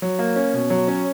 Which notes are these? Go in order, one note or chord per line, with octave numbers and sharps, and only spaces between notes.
F#3
A#3
C#4
B2
F#3
C#4